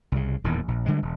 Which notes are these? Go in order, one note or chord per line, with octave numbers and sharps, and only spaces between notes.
C2 C#3
D#1 E2 A2 D#3
A#1
D3 G3 G#3
E1